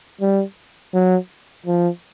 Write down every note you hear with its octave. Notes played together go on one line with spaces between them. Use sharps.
G3
F#3
F3